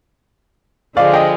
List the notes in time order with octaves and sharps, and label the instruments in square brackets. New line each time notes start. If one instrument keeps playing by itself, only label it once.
[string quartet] D3 F3 G#3 [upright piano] D5 F5
[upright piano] D#5 G5